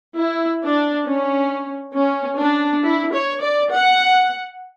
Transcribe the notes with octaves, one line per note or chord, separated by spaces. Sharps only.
E4
D4
C#4
C#4
D4
E4
C#5
D5
F#5